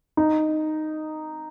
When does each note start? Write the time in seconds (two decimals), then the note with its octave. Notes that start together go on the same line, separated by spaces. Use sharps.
0.17 D#4